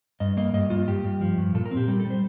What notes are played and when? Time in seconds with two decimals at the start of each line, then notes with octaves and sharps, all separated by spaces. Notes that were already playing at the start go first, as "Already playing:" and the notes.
0.20 G2 D#5
0.37 A#3 D#5
0.54 G2 D#5
0.70 G2 F4
0.88 G2 G4
1.04 G2
1.21 F3
1.38 G2
1.55 A#2 A4
1.66 A#4
1.71 C4
1.77 G4
1.88 G3 G4
2.00 A4
2.05 G3
2.10 C5